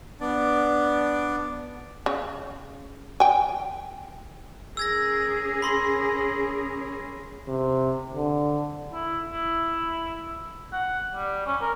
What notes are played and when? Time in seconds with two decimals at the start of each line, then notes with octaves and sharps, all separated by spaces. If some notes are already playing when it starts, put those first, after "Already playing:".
0.21 B3 D4 D5
2.06 C#3
3.20 G5 G#5
4.77 C#4 G#4 A#4 E6 G#6 A#6
5.62 B5 C6 A#6
7.48 C3
8.14 D3
8.93 E4
9.30 E4
10.73 F#5
11.14 G3
11.46 C#4
11.62 A#4